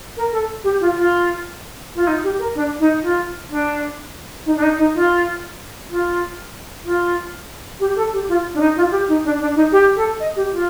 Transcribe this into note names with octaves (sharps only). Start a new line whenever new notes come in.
A#4
A4
G4
F4
F4
F4
D#4
G4
A#4
D4
D#4
F4
D4
D#4
D4
D#4
D#4
F4
F4
F4
G4
A4
G4
F4
D4
D#4
F4
G4
D#4
D4
D4
D#4
G4
A4
D#5
G4
F4